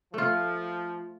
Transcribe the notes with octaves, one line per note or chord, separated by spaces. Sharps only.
F3 A3 F4